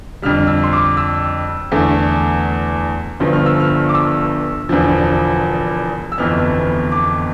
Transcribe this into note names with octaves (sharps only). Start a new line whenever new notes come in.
F2 D3 G3 F6
E6
C6
D6
E6
E2 D3 A3
G1 G2 D3 F3
F6
E6
F6
D6
E6
E1 E2 D3 F3
E6
G1 F2 E3 B3 F6
D6